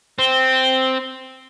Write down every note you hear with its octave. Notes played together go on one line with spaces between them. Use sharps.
C4